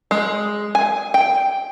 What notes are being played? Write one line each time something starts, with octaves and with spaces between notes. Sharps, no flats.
G#3
G#5
G5